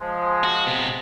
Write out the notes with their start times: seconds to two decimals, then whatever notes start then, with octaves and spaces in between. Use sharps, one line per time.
0.01 F3 G#3
0.44 F#4
0.67 C3 B3